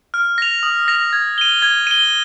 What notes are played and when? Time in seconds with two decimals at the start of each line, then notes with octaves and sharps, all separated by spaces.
0.14 F6
0.38 A#6 F7
0.63 D#6
0.88 A#6 F7
1.13 G#6
1.38 D#7 G7
1.62 G#6
1.87 D#7 G7